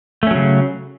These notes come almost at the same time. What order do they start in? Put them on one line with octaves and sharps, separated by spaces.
A3 C#4 F#3 C#3